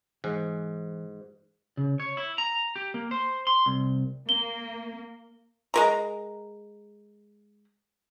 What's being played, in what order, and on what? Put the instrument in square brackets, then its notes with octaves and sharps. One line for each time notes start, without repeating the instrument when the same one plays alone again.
[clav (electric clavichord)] G#2 [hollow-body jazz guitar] E3 G#5
[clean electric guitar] C#3
C#5
E4
A#5
G4
A#3
C5
C6
C2
[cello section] A#3 [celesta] G7
[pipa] G#3 A#4 A#5